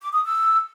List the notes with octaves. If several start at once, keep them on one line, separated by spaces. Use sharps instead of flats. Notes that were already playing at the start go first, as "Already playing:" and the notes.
D6
D#6
E6